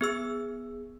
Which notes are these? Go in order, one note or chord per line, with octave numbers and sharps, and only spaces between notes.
B3 G#4 E6